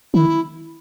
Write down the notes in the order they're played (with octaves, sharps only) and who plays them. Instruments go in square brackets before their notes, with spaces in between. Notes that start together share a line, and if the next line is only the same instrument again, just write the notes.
[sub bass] D#3 [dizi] E4